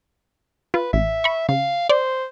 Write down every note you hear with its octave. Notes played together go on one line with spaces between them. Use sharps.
F4 B4
A1 E5
B5 C#6
C#3 F5
C5 D5